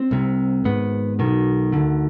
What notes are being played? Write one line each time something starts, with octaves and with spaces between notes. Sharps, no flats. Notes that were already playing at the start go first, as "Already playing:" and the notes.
Already playing: C4
C2 C3
G#1 G#2 B3
B1 B2 D#3
D2 D3